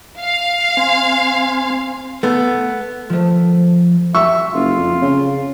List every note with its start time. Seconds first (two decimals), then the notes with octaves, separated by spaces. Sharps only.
0.20 F5
0.77 C4 G#5 C6
2.23 A3 B3
3.10 F3 A3
4.15 E5 C#6 E6
4.53 F#1 F4
4.77 F2
5.02 C#3